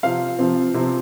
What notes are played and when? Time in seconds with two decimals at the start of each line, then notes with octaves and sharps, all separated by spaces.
0.03 C3 F3 C4 F5
0.39 C3 F3 C4
0.74 C3 F3 C4